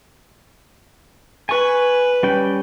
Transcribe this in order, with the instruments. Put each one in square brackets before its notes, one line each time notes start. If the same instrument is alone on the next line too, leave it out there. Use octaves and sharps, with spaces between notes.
[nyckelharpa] B4 [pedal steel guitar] G#5 C#6
[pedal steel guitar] G3 C#4 G5